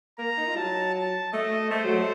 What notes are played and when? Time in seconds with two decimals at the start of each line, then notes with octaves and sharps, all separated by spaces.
0.18 A#3 A#5
0.37 D#4
0.47 F4
0.56 F#3 A5
0.95 A5
1.33 A3 D#5
1.70 A3 C5
1.84 F#3
1.99 A3